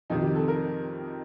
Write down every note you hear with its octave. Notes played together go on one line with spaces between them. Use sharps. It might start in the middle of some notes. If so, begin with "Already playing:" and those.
F2 C3 D#3 D#4
G4
A4
A#4